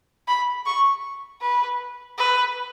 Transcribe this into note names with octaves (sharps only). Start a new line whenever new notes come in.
B5
C#6
B4
B4